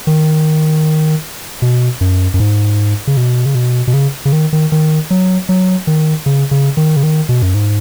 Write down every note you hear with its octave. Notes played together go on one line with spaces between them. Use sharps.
D#3
B2
F#2
F#2
G#2
C#3
B2
C#3
B2
B2
C#3
C#3
D#3
D#3
D#3
F#3
F#3
D#3
C#3
C#3
D#3
C#3
D#3
B2
F#2
G#2